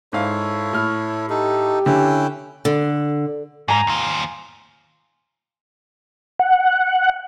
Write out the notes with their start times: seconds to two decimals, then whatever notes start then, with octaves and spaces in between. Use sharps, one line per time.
0.13 G#2 E4 A4 C#5 F5
0.73 A2 F6
1.29 D#4 G4 A4
1.86 D3 C#4 E4 G5
2.65 D3
3.68 G#2 G#5 A#5
3.87 D#2 F4
6.39 F#5